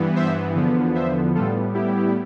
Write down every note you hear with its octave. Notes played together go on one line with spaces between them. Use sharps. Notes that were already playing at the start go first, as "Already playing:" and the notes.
Already playing: G2 E3 B3
C5 E5
E2 D3 F3 B3
C5 E5
A2 G3 B3 F4 A4
E4 G4